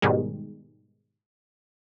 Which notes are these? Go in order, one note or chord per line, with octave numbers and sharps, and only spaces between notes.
G#2 B2 D#3 G3 G#3